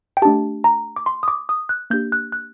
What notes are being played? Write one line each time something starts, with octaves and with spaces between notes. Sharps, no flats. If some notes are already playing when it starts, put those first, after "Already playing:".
G5
A3 D4 G4 A5
A#5
D6
C6
D#6
D6
D#6
F#6
A#3 D4 G4 G6
F#6
F#6